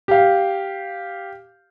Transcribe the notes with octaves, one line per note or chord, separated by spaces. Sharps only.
G4 F5